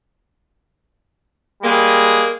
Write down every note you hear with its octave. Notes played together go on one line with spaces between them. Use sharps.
G3 G#3 A#3 G#4